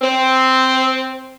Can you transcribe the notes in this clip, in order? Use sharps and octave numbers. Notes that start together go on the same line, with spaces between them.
C4